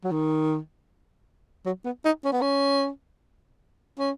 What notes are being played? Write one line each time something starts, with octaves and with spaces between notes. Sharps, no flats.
F#3
D#3
F#3
B3
D#4
C#4
B3
C#4
C#4